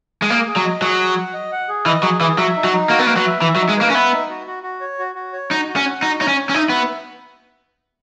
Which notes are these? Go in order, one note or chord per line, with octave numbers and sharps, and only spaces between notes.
G#3
A#3 G#4
G#4
F#3
D#5
F#3 G#4
G#4
F#5
D#5
F#5
G#4
E3 D#5
F#3 G#4
E3 G#4
F#3 E5
D#4
F#3
D#4
A#3 F#4
B3
A#3 B4
F#3
E5
E3 E5
F#3
D#4
G#3
A#3 B4
C#4
B3 E5
D#4
F#4
F#4
F#4
C#5
F#4
F#4
C#5
D#4 F#4
F#4
C#4
F#5
D#4 F#4
D#4 C#5
C#4
C#5
C#4
D#4 E5
B3 F#4